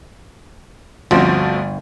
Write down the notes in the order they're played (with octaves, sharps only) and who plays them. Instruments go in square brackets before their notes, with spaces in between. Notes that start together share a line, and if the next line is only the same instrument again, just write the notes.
[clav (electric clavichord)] G1 [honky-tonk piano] D2 F3 [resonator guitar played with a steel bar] C4 C#4 F#4